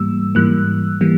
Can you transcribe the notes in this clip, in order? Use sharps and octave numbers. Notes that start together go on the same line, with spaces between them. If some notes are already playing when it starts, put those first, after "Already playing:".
Already playing: G#2 E3 G3 A#3 E6
G#2 E3 G3 A#3 F#6
E3 G3 A#3